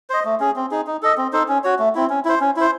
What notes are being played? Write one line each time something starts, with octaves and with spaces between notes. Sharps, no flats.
C5 D#5
A3
C#4 G#4
C4
D#4 G#4
D#4
A4 D#5
C4
D#4 A4 C5
C#4
F#4 C#5
A3
C4 E4
C#4
E4 C5
C#4
E4 C5